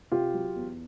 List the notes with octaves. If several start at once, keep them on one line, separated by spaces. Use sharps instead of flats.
C3 F4 G4
F#3
E2